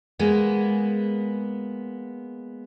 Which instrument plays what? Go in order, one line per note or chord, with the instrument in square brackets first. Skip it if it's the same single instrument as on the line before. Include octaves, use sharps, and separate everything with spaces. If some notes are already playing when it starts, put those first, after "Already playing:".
[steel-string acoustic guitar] G#3 A#3 B3